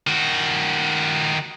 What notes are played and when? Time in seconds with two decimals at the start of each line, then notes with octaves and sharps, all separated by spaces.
0.07 D#3 F#4